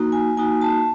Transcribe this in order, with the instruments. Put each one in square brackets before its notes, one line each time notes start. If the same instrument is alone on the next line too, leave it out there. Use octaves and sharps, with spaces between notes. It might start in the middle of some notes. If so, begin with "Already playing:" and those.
Already playing: [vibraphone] A#3 D#4 F#4
G#5
A#3 D#4 F#4 G#5
A5